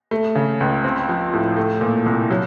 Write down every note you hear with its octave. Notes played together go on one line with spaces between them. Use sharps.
A3
C#3
C#2
C4
F3
A2
A3
A#2
C2
F#3